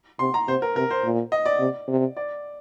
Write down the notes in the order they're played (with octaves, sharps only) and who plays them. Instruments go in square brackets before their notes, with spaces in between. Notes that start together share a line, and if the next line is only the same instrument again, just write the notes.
[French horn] C3 [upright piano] C6
[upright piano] A#5
[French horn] C3 [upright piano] C5
[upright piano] A#4
[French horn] C3 [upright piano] A#4
[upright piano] C5
[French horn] A#2
[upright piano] D#5
D5
[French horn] C3
C3
[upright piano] D5